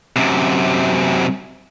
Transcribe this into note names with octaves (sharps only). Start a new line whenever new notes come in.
F#2 C3